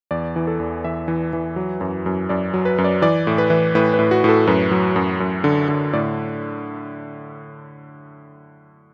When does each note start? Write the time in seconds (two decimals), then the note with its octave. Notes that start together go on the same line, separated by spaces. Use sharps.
0.11 E2 D5
0.36 E3
0.47 A4
0.60 E2
0.84 E3 E5
1.08 E3
1.33 E3
1.56 F#3
1.81 F#2
2.06 F#2
2.29 F#2 D5
2.54 F#3
2.65 B4
2.78 F#2
2.84 D5
3.02 E3 D5
3.27 A2
3.38 B4
3.50 E3
3.75 A2 B4
3.94 B4
3.99 A2
4.11 F#4
4.24 A2 A4
4.47 F#2 B4
4.72 F#3
4.96 F#2
5.20 F#2
5.44 D3
5.69 D3
5.93 A2 D5